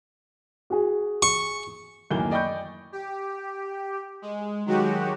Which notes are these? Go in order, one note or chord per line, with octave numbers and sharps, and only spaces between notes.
F#4 G#4
C#6
D1 F#2 D#3 E3 A#3 G7
D5 D#5 G5 B5 C#6 G6
G4
G#3
D#3 F#3 G#3 F#4 G4